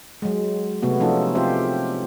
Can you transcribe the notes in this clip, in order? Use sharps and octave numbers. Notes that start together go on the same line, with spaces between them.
F#3 G#3
C3 A3 B3 F#4
F3 A3 C#4 D#4 F4 A4
C4 F4 G4 C5 E5